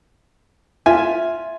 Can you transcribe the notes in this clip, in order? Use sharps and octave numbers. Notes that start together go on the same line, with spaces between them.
F4 E5 G#5